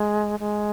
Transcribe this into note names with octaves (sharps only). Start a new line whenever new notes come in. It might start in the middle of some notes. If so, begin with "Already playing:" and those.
Already playing: G#3
G#3